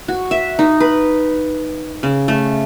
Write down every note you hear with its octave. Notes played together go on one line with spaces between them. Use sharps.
F#4
E5
D#4
B4
C#3
A3